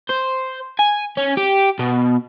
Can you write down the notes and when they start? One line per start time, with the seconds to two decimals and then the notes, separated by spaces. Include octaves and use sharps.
0.09 C5
0.79 G#5
1.17 C#4
1.37 G4
1.79 B2